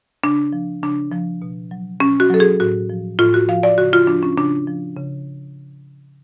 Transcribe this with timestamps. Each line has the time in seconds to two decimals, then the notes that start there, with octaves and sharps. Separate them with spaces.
0.24 C#3 D4
0.53 F3
0.83 C#3 D4
1.12 F3
1.42 B2
1.71 F#3
2.00 B2 C#4
2.20 F#4
2.30 F#3 A4
2.40 G#4
2.60 A2 F#4
2.90 F3
3.19 A2 F4
3.34 F#4
3.48 F3 F5
3.63 D5
3.78 C#3 F#4
3.93 F4
4.07 F3 D4
4.23 C#4
4.37 C#3 D4
4.67 F3
4.97 C#3